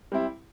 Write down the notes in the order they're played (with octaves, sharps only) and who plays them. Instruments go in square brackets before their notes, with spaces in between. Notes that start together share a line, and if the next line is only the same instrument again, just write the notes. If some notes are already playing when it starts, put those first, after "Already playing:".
[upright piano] G3 C4 E4